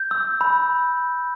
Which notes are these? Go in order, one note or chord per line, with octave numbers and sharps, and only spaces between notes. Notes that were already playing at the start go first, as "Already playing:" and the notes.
Already playing: G6
E6
B5